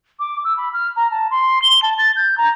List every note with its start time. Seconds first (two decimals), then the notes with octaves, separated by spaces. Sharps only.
0.19 D6
0.44 E6
0.57 B5
0.73 F6
0.96 A#5
1.11 A5
1.31 C6
1.62 G7
1.82 A5
1.98 A6
2.16 G6
2.37 A#5